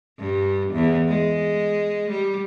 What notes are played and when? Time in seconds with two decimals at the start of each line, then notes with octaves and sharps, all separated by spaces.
0.19 G2
0.73 E2
1.09 G#3
2.11 G3